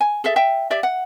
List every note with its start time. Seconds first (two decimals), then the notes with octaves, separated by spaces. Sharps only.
0.01 G#5
0.24 G#4 A4 E5
0.36 E5 G5
0.70 G4 D5 E5
0.83 F#5